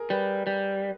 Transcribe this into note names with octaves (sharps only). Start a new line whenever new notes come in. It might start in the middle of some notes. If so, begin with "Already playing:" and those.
Already playing: G#4 A#4
G3 B4
G3